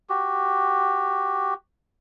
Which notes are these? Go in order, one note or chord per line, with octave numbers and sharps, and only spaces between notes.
F#4 G4